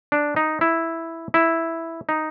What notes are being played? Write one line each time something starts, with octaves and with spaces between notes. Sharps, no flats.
D4
D#4
E4
E4
D#4